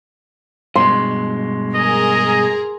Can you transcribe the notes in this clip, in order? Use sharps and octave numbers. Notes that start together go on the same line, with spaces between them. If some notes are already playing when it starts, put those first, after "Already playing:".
G2 B2 G#3 C6
G#4 A#4 D#5